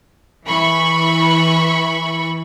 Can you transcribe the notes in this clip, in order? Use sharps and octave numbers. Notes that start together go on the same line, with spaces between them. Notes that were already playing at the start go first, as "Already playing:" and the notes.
E3 B5 C#6